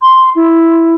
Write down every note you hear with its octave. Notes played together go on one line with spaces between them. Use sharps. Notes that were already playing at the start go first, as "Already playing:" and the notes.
C6
E4